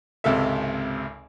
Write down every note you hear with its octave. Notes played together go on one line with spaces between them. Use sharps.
G#1 C#2 C3 A4 E5